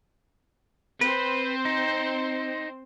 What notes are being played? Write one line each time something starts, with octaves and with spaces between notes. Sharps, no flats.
C4 B4 C5
D#4